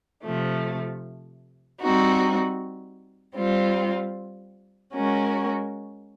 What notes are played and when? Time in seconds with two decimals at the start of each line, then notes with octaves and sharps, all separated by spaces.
0.23 C3 F3 A3
1.80 G3 C4 D#4 F#4
3.35 G3 C4 F4
4.93 G#3 C#4 F#4 A#4